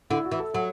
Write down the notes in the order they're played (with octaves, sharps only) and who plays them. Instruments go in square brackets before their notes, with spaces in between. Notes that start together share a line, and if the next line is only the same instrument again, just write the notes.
[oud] D3 [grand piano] E4
[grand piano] F#4
[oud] E3
[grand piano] A4
[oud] F#3 [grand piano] A4